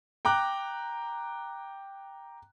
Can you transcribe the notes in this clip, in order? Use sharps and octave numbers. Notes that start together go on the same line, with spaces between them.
G5 A#5 D6 F#6